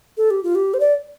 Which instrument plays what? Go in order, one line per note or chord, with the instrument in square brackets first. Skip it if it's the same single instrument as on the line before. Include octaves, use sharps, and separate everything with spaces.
[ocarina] A4
G4
F4
G4
C5
D5